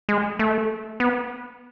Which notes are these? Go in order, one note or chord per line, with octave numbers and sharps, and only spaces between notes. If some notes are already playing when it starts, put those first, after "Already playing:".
G#3
A3
B3